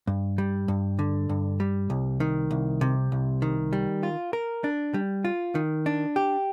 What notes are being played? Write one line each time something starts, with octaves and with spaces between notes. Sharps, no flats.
G2
G3
G2
D3
G2
G3
C2
D#3
C2
C3
C2
D#3
G3
F4
A#4
D4
G3
F4
D#3
D4
G4